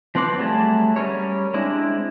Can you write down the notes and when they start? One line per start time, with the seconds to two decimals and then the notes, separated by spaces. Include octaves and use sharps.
0.15 F3 C4 B4 C6 D6
0.38 F#3 G3 A3 G#4 A5
0.96 G3 C#4 A#4 C#5
1.54 G#3 C4 D4 E4